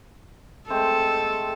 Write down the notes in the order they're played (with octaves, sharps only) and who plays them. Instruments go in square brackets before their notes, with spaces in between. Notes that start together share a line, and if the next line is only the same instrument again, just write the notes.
[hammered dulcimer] G#3 A3 C4 [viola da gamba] A4